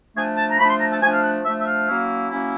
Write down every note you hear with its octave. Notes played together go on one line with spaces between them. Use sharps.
F3 A3 D4 G#5
A5
A#5
F3 A3 D4 B5
C6
A#5
A5
F3 A3 D4 G#5
F5
F#5
F3 A3 D4 E5
E5
F5
F#3 A#3 C#4 E4
F#3 A#3 C#4 E4